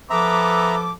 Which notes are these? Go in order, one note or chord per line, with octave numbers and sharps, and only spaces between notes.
F3 B3 A4 E5 A#5 D6